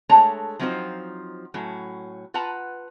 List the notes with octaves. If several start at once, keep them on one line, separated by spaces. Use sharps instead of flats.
G#3 A3 D4 C#5 A5 A#5
F3 F#3 C4 D#4 F4 C5
A2 F#3 C#4
F4 B4 F#5 A5 A#5